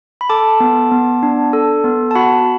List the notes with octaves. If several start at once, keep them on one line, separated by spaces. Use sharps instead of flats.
B5
A4 A5 D6
B3
B3
D4
A4
B3
A5
F#4 F#5 B5